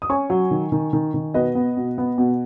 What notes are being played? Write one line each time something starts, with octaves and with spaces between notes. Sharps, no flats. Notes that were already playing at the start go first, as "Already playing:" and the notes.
D#6
C#4 G#5 C#6
F#3
D#3
D#3
D#3
D#3
B2 B4 D#5
B3
B2
B3
B2